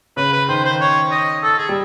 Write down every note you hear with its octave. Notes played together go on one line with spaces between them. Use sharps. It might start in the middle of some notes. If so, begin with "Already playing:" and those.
C#3 B4
B4
D#3 C5
C5
C#5
D#5
A4
G#4
G3